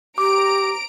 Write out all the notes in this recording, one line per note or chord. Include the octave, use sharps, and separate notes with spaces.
G4 A#5 D6 D7